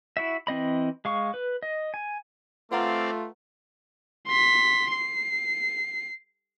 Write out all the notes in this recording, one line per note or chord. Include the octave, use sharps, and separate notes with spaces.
E4 F#4 E5
E3 C4 D#5 B5
G#3 F5 C#6
B4
D#5
G#5
A3 C4 F4 B4 D5 F5 F#5 A#5
C6 B6
C7